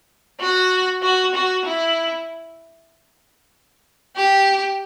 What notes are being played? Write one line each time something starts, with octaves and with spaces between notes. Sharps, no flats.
F#4
F#4
F#4
E4
G4